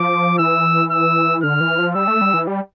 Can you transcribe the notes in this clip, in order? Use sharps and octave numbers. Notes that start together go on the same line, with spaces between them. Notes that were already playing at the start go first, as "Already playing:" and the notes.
Already playing: F3 D6
E3 E6
E6
D3 F6
E3
F3
G3 E6
A3
G3
E3
G3